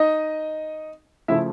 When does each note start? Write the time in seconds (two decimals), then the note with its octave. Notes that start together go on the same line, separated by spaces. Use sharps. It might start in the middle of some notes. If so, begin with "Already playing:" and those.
Already playing: D#4 D#5
1.28 C#3 F3 A3 E4 E5